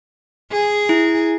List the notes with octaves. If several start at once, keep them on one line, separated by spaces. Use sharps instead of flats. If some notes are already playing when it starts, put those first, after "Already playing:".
G#4
E4